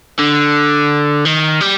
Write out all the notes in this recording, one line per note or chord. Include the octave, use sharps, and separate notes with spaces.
D3
D#3
G3